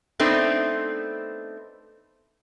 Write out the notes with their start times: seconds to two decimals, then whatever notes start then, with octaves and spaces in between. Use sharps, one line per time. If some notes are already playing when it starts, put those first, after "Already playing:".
0.20 A3 B3 C4 D4 D#4 C5